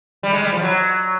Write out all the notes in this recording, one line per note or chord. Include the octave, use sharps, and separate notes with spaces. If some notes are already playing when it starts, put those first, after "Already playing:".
G3
G#3
G3
F3
F#3